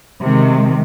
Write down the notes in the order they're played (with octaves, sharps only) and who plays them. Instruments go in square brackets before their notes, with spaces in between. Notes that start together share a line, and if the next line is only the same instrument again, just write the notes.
[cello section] C3 D#3 G#3